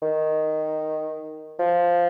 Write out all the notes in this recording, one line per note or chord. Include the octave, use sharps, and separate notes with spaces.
D#3
F3